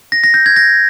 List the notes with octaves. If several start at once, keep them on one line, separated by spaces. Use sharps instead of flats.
A#6
A#6
G6
G#6
A#6